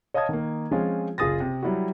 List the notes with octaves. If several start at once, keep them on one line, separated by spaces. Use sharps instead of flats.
C#5 D#5 F5 A5 D#6 G#6
D#3 A#3
F3 G#3 C4 C#4 F4
F#1 F4 G#4 D#6 A6 A#6
C3
F#3 G3 E4 F#4